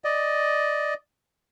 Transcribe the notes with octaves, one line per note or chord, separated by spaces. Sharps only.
D5 D#5